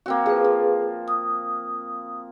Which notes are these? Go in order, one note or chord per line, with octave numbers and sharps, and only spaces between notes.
A#3 C4 F#4
F3 G#4 B4
F4
D#6